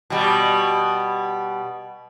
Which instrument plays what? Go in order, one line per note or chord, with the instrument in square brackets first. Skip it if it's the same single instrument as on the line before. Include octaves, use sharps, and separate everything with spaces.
[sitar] B2 G3